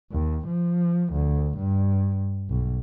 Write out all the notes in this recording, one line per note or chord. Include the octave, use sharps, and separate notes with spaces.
D#2
F3
D2
G2
B1